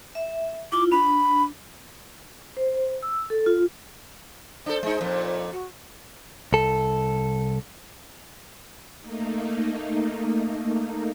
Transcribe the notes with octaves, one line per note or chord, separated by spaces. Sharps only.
E5
E4 F4 D6
D4 B5
C5
E6
A4
F4
D4 A4 C5
G#3 D#4
F2 A#2
F#4
C2 A4
A3 A#3 D#4